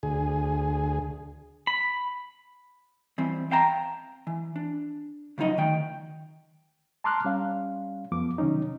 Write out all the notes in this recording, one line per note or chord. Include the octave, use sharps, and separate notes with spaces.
D2 G#4
B5
E3 G3 C4
C4 F5 G5 A5 A#5
E3
D4
C#3 F3 F#3 D#4 D#5
D2 D#3 G5
A5 A#5 C6 D6 F6 F#6
G3 C#4 F5
F2 F3 B3 D6
C3 D#3 F#3 C#4 D#4